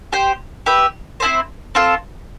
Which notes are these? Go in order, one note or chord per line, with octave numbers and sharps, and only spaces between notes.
G4 C5 G5
G4 B4 E5
C4 E4 A4 C5
C4 F4 A4